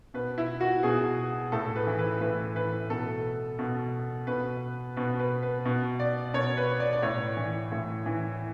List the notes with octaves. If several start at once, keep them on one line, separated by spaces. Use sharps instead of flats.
B2 B4
E4
F#4
B2 G#4
A2 A4
B4
E3
B4
A2 B4
E3 B4
B2 A4
B2
B2 B4
B2 B4
B4
B4
B2
D5
B2 C#5
B4
D5
D5
A2 C#5
E3
A2
E3